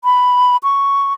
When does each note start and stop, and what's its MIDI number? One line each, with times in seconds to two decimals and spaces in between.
0.04 0.57 83
0.63 1.13 85